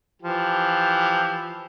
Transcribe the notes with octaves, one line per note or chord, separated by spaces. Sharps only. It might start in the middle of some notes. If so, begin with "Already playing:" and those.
E3 F3 G4